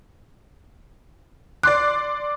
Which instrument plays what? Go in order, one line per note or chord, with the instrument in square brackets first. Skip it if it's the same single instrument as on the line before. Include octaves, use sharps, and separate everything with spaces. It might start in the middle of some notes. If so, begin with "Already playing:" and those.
[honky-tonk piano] D5 C6 D6 [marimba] F#6